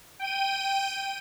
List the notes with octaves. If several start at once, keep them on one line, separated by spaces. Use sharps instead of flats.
G5 D#7